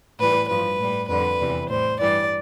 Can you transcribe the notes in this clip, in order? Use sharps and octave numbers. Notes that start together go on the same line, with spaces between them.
A2 E3 G3 B4
G2 F3 B4
A2 G3
F2 D3 G3 B4
E2 C3 E3 G3
A2 G3 C5
G2 E3 G3 D5